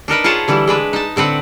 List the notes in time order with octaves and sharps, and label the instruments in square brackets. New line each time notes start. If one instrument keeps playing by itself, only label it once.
[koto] D4 D#4 A#4 B4
F4 G#4 B4 C#5 F#5 A5
D3 E3 G3 E4
G#3 D4 B4
D#4 A5
A2 D3 C4 B4 F#5